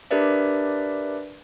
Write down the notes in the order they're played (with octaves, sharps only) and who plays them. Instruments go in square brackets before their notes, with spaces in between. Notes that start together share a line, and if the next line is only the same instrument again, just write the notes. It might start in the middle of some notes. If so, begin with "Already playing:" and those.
[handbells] D4 G4 A#4 B4 D5 E5